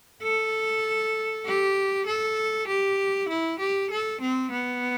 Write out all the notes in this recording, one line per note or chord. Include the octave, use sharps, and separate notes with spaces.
A4
G4
A4
G4
E4
G4
A4
C4
B3